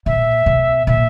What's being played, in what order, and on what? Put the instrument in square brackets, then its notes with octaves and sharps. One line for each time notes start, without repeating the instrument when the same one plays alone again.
[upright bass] A#2 [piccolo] E5
[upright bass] B2
[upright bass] A#2 [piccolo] E5